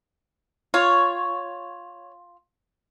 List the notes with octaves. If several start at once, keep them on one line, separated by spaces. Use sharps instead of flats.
F4 C#5